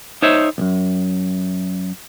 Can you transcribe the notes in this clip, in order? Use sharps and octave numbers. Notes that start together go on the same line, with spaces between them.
D#4 C5 C#5 E5
B1 F#2